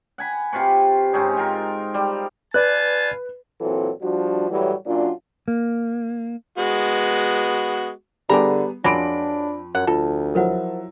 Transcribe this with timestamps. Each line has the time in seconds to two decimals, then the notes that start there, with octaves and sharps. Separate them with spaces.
0.18 F#5 G#5 B5
0.53 C3 F4 B4 C#6
1.13 G#2 C4 C#4 D#4
1.37 C4 F4 A#4
1.94 G3
2.54 F4 B4 D5 G#5 A5 F#6
3.61 A#2 E3 F#3 C4 A4
4.02 F3 G3 D4 F#4
4.50 A2 E3 F#3 G3
4.86 F#2 A#2 F#3 D4 F4
5.48 A#3
6.58 G#3 B3 F#4
8.29 D3 G3 B3 D4 G4 G#4 A#5 B5
8.84 F2 F#3 G#3 A#3 D4 B5 A#6 D7
9.75 F#2 F#5
9.87 D2 F4 A4
10.35 F3 F#3 E4 A#4 C5 F#5